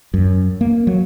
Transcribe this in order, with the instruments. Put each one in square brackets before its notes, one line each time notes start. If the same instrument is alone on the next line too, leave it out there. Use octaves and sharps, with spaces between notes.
[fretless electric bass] F#2
A#3
F#3